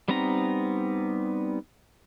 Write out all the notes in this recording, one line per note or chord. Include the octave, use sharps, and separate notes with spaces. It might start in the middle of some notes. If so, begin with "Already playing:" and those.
G3 B3 C4 D#4 A#5